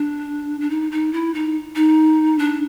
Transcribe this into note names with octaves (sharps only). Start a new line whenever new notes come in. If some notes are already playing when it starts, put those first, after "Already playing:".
Already playing: D4
D4
D#4
D#4
E4
D#4
D#4
D4